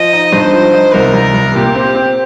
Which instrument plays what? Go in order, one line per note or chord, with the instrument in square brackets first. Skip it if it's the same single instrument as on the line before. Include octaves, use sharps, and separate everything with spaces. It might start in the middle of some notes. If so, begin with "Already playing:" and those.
Already playing: [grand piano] F3 [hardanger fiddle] D#5
[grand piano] D#4
[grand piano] G2 [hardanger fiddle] C5
[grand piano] F3
D#4
[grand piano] C2 [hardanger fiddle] A#4
[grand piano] C2
C2
[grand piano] A#2 [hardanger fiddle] G4
[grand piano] C4
C4